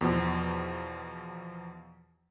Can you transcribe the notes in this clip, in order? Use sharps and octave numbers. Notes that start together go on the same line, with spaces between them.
E2 B2 F3